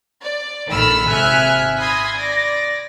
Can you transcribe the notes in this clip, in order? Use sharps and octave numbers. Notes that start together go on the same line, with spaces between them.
D5
A#1 D#3 A4 B5 E6 F6
G#1 C3 E5 G#5 F6 F#6
B5 C6 D#6 G#6 A#6 C7
D5 A#6